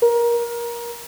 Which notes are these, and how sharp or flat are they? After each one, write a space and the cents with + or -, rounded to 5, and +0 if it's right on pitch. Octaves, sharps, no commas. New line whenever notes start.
A#4 +25